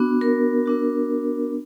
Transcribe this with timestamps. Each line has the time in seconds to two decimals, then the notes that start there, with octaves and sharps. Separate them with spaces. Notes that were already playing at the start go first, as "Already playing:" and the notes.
Already playing: B3 D4 F#4
0.21 A#4
0.66 B3 D4 F#4